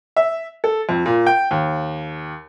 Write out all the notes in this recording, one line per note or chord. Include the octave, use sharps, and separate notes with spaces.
E5
A4
F2
A#2
G5
D#2